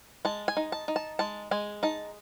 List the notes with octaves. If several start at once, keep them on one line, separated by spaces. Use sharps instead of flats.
G#3 A5
G#5
D#4
A5
D#4
A5
G#3 A5
G#3 G#5
D#4 A5